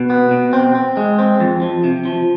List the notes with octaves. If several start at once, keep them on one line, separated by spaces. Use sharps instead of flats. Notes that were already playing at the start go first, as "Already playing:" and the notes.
Already playing: B2
B3
B2
C4
C4
G#3
C4
F2
F3
C3
F3